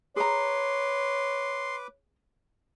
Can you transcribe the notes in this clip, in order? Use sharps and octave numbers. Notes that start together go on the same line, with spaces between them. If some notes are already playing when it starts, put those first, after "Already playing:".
G#4 B4 C#5 A#5 C6 D6